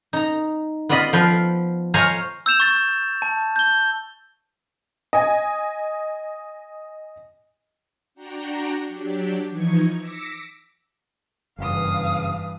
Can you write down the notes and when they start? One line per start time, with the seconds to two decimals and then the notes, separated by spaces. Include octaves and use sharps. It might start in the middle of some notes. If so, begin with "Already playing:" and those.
0.13 D#4 A#5
0.89 B3 F4 D5 D#5 B5
1.13 F3 F4 B4 G5
1.94 C5 C#5 D#5 F5 G#5 A#5
2.46 E6 G6 E7 F7
2.60 C#6 A6
3.22 A5
3.56 G6 G7
5.13 D#5 G#5
8.15 D4 F#4 G5 A#5
8.87 F#3 D4 G4
9.49 E3 F3 D#4 C#6 G#6
9.97 D6 E6 A#6 B6 C#7
11.59 F#1 G2 E3 F5 D#6